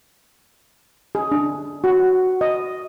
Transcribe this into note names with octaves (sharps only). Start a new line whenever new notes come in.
G#4
D4
F#4
D#5